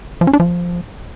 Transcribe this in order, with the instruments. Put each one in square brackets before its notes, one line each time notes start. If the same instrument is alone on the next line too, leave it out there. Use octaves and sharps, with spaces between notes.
[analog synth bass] F3
C#4
D4
F3